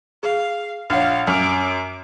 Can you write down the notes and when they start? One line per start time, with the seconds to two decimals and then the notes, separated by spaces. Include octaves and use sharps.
0.23 G#4 F5
0.90 A#1 C#5 F5 F#5 F6
1.27 F#2 D6 F6 F7